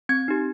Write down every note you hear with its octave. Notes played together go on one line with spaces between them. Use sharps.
C4 G#6
D#4 G4